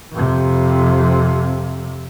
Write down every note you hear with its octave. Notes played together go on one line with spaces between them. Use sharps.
F2 C3